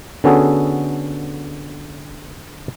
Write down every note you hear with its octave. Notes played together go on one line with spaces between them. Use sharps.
D3 B3 C#4 F#4 G#4 A4